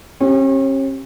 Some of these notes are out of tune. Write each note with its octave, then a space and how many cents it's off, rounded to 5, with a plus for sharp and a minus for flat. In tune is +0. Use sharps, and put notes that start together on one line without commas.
C#4 -40 G4 +0